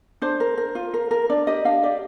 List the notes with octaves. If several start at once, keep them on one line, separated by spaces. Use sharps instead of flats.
D4 C5
A#4
A#4
F4
A#4
A#4
D4 D5
G4 D#5
D4 F5
G4 D5